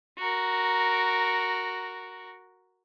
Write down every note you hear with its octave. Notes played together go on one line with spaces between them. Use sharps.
F#4 A#4